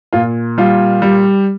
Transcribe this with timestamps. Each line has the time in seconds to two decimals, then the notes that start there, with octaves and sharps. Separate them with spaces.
0.13 A#2 F4
0.58 G3 F4
1.02 G3